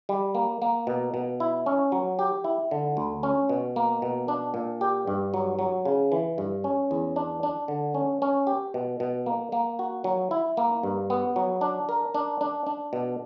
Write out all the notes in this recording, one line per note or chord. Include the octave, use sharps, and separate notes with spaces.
G3
A#3
A#3
B2
B2
E4
C#4
F#3
G4
E4
D3
D2
C#4
B2
A#3
B2
D4
A#2
G4
G2
F#3
F#3
C#3
E3
G2
C#4
E2
D4
D4
D3
C#4
C#4
G4
B2
B2
A#3
A#3
F#4
F#3
E4
A#3
G2
B3
F#3
D4
A#4
D4
D4
D4
B2